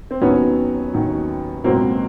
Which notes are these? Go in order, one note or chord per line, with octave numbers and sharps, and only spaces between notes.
C4
D#2 D#3 F#3 B3 C#4
D#2 D#3 F#3
C#2 B2 F#3 A#3 C4